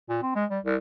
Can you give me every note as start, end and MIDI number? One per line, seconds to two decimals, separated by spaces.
0.10 0.18 46
0.22 0.33 60
0.35 0.45 56
0.50 0.59 55
0.65 0.76 36